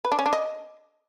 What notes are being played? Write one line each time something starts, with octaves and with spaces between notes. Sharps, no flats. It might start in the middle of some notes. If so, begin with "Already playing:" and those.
B4
D4
C#4
D4
D#5